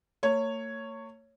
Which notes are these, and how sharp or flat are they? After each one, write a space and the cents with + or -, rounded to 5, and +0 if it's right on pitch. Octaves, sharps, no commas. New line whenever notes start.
A#3 -45 C#5 +0